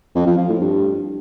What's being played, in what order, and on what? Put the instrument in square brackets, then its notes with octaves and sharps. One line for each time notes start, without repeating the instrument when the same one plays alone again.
[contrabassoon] F2
F3
F3
A2
G2